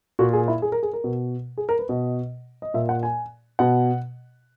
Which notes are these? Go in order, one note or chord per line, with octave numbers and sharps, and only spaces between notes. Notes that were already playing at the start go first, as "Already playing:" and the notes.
A#2 F#4
G#4
E4
G#4
A#4
G#4
A#4
B2
G#4
A#4
B4
B2 D#5
D#5
A#2 E5
F#5
G#5
B2 F#5